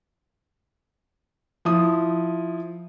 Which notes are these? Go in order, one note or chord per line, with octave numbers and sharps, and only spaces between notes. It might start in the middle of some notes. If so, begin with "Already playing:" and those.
F3 E4 D#6